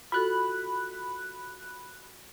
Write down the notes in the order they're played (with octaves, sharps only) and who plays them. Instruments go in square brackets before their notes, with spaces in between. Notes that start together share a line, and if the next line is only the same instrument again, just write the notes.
[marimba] F4 F#4 A4 [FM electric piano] B5 F#6